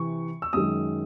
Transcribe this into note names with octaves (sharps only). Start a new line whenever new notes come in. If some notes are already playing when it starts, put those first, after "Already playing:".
Already playing: C3 E3 C#6
E6
F#2 D#3 G#3 D#6